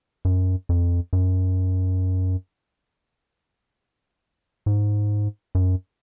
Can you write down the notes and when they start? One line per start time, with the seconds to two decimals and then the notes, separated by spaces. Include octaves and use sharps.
0.25 F#2
0.69 F2
1.13 F#2
4.66 G#2
5.55 F#2